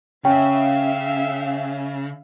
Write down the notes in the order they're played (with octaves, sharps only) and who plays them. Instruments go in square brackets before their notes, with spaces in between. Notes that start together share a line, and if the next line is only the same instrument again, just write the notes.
[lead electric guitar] C#3 [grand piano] C#4 [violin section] E5 F5 [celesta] G5